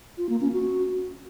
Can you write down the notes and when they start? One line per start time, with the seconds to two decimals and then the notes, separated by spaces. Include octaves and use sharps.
0.18 F4
0.29 A#3
0.41 C#4
0.53 F#4